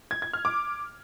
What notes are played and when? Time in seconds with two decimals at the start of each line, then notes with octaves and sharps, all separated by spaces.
0.11 G#6
0.22 G#6
0.33 F6
0.45 D6